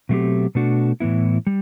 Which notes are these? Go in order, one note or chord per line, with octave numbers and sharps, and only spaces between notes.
B2 F#3 A3 C4 G4
B2 A3 D4 F#4
A2 E3 B3 E4
G3